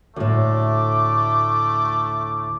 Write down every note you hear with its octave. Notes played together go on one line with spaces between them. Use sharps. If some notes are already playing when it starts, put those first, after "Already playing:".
D2 A2 A3 D6